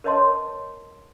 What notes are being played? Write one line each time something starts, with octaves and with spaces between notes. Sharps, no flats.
A#4 B4 C#5 D#5 A5 C6